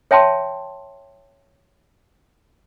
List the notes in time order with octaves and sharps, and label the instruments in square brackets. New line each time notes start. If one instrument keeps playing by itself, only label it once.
[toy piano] C#5 E5 G5 A5 C6